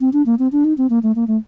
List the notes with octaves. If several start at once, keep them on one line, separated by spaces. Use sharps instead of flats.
C4
D4
A#3
C4
D4
D#4
C4
A#3
A3
A#3
A3